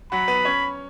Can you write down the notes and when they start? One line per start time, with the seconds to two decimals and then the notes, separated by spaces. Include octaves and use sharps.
0.12 F#3 F#4 B5
0.28 B3 B4
0.45 C#4 C#5